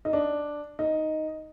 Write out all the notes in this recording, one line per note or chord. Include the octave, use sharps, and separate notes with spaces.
D#4
D4
D#4